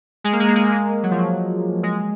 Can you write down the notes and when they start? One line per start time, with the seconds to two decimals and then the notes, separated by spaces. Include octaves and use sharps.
0.24 G#3
0.33 A#3
0.40 G#3
0.48 A#3
0.56 G#3
0.64 A#3
0.72 G#3
1.03 F#3
1.11 F3
1.19 F#3
1.83 G#3